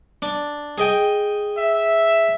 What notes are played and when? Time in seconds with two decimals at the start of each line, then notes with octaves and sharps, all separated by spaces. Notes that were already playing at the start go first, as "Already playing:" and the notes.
0.22 D4
0.78 G#4 D#5 G5
1.58 E5